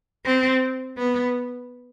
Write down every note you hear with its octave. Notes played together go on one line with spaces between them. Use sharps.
C4
B3